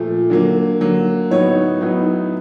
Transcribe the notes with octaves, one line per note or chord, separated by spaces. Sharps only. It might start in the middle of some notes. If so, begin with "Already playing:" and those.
Already playing: A#2 F3 A3
D3 F#3 A#3
D3 F#3 A#3
A2 F#3 B3 D#4 C#5
A2 F#3 B3 D#4